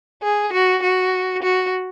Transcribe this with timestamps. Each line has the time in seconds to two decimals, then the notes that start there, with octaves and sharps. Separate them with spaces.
0.22 G#4
0.53 F#4
0.83 F#4
1.42 F#4